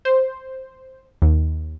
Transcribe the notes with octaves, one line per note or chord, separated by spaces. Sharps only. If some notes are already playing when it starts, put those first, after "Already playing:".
C5
D#2